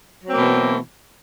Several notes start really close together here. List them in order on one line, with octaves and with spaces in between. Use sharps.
F#3 C4 A#3 B2 E3